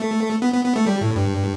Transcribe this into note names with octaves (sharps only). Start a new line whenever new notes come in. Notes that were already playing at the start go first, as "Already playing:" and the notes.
Already playing: A3
B3
B3
B3
A3
G3
A2
G2